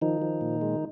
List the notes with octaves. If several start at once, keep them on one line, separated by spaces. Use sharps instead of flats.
D#3 F3 D#4
F3
A#2
G#3